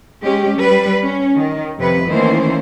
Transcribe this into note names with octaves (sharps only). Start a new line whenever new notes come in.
G#3 C#4 G4
G3 B4
C#4
D#3
F2 C3 B4
D#3 E3 A3 A#3 C#4 C5